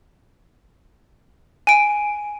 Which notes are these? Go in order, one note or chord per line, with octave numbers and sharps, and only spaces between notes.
G#5 D7